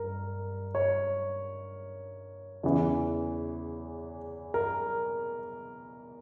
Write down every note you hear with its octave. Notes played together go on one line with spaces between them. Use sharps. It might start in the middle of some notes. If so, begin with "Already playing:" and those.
Already playing: G2 A#4
C#5
E2 C#3 E3
A#4